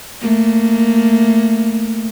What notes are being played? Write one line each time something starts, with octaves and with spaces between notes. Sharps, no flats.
A3 A#3